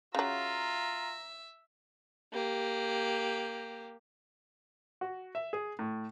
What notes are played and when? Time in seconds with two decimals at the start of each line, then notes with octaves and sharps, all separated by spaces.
0.15 C#3 F#3 F4 E5 A#5
2.33 A#3 G4
5.01 F#4
5.35 E5
5.53 G#4
5.79 A2